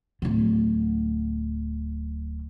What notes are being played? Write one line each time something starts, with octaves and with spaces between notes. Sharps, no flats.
D1 D3